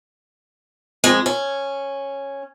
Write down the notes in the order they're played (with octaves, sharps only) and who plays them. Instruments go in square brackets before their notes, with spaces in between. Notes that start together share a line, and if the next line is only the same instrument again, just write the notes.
[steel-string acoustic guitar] F2 G#3
C#4